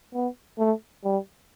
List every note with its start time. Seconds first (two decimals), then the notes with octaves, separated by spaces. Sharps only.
0.14 B3
0.59 A3
1.04 G3